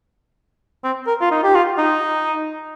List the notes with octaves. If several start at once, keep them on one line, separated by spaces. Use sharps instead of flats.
C4
A#4
F4
D#4
G4
F4
D#4